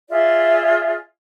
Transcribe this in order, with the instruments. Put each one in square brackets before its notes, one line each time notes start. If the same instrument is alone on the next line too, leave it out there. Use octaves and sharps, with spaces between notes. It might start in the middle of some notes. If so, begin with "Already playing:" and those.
[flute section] F4 G#4 D5 E5